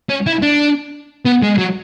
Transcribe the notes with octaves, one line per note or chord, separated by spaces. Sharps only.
C#4
E4
D4
B3
G#3
F#3